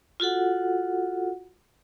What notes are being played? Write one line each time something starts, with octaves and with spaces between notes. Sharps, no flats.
F4 F#4 A4 F#5